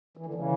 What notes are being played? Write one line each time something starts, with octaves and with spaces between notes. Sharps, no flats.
E3
D3
C#3 E3